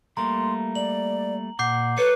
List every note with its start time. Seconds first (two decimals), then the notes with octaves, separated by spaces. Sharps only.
0.17 G3 A3 A#3 A#5 C6
0.75 D5 F#7
1.59 A#2 F#5 D6 G6 C7
1.98 A4 B4 C#5 C#7